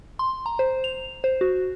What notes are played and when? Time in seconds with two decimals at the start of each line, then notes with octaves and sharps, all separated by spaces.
0.19 C6
0.46 A#5
0.59 C5
0.84 F7
1.24 C5
1.41 F#4